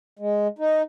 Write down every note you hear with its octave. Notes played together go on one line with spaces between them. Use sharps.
G#3
D#4